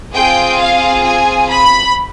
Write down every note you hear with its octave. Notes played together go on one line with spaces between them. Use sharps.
C4 F4 G#4 G5
F5
G#5
B5